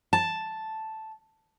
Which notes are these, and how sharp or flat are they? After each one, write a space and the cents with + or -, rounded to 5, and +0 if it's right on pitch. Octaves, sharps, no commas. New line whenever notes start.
A5 +0